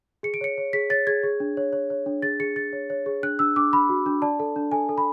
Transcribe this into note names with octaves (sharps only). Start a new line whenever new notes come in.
G#4 C#7
D7
C#5 C#7
C#5
G#4 B6
C#5 A6
G#4 G#6
G#4
D4
C#5
C#5
C#5
D4
G#4 A6
G#4 C#7
G#4 A6
C#5
C#5
G#4
D4 F#6
D4 E6
D4 D6
D4 B5
F#4
D4
D5 A5
A4
D4
A4 G#5
A4
B5